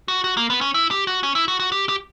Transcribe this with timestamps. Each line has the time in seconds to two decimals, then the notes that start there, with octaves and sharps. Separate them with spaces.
0.08 F#4
0.24 F#4
0.37 A#3
0.50 B3
0.61 C#4
0.74 E4
0.91 G4
1.07 F#4
1.23 C#4
1.35 E4
1.48 F#4
1.60 F#4
1.72 G4
1.89 G4